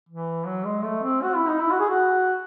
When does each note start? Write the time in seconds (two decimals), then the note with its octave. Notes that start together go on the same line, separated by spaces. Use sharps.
0.09 E3
0.47 F#3
0.65 G#3
0.84 A3
1.03 C4
1.23 F#4
1.35 E4
1.48 D#4
1.61 E4
1.71 F#4
1.80 G#4
1.89 F#4